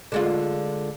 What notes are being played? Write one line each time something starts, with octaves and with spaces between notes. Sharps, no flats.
D3 G#3 F4